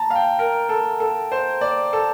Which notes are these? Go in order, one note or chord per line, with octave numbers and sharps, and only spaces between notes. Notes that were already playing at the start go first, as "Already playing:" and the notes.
Already playing: A5 A#5
F5
G5
A#4
A4
A4
C5
D5
A4